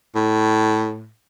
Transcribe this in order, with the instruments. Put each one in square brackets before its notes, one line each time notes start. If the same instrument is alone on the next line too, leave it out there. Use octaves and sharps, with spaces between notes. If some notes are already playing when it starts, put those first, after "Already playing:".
[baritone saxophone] A2